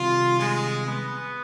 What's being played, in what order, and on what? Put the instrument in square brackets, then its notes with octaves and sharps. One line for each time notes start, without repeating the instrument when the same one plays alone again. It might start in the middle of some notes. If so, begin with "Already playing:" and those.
Already playing: [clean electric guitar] C3 D#3 G3 [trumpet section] F4
[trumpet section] G#3
B3